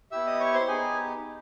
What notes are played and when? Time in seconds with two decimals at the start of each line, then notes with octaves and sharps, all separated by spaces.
0.11 B3 E4 G4 E5 E6
0.27 D#5 D#6
0.40 C#5 C#6
0.54 C5 C6
0.68 B3 D#4 G4 G#4 G#5